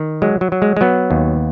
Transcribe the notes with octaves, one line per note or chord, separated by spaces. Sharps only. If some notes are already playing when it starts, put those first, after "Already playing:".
Already playing: D#3
F#3 G#3
F#3
F#3
G#3
G#3
F#3 B3
D#2